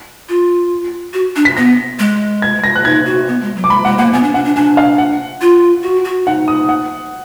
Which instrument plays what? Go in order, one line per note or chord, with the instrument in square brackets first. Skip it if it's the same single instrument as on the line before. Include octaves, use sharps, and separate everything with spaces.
[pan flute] F4
F#4
D4
[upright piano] B6
[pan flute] B3 [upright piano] A#6
[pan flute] G#3
[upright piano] G#6
A#6
F#6
[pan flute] D#4 [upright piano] G#6
[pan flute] F#4
B3
G#3
F#3
[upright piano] D6
[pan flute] G#3 [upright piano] B5
[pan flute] G#3 [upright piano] F#5
[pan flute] A#3 [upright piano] F#5
[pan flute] B3 [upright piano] G#5
[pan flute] D4
[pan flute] D4 [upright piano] F#5
[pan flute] D4
[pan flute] D4 [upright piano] G#5
[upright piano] F5
F#5
[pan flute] F4
F#4
F#4
[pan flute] D#4 [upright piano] F#5
[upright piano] D#6
F#5